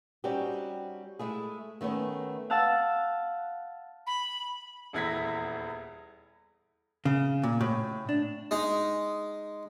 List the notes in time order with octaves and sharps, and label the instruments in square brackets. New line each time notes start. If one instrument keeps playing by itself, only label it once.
[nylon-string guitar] G3 C4 C#4 D#4 F#4 G4
G#3 A3 E4 G#4
D#3 A3 B3 C#4
[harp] F5 F#5 A5 E6
[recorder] B5
[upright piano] D#1 E2 E4 G#6 A#6 B6
[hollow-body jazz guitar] C#3
A#2
A2
D4
[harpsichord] G#3 D#4